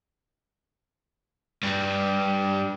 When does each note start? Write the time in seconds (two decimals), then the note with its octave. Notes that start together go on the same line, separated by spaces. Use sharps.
1.63 G2 G3